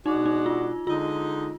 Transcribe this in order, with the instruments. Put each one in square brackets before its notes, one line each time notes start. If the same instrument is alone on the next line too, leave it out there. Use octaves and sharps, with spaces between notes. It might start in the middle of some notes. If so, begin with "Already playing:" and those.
[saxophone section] B2 G#3 D4 F#4 [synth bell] D#4
[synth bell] D#4
F4
[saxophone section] D3 G#3 D#4 [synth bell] F4